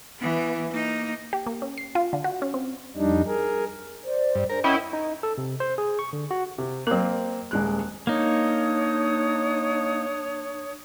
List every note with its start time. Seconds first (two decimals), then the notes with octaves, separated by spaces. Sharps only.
0.19 E3 B3
0.70 A#3 D#4
1.33 G4
1.46 A#3
1.62 C#4
1.78 C7
1.95 F4
2.13 D3
2.24 F#4
2.42 C#4
2.54 C4
2.96 F2 G3 D4 D#4
3.26 G#4 A#4
4.04 C5 D5
4.35 G2
4.50 D4 G#4 A#4 C5
4.64 C#4 E4 A#4 D#5 F#5 G5 E6
4.93 D#4
5.23 A4
5.38 C3
5.60 C5
5.78 G#4
5.99 C#6
6.13 D3
6.31 F#4
6.58 C3
6.87 F#3 A#3 C4 A#4
7.51 D#1 G#3 F#6
8.07 A#3 D4 D#4 C#5 D#6